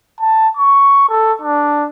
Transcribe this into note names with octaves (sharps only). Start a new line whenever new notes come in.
A5
C#6
A4
D4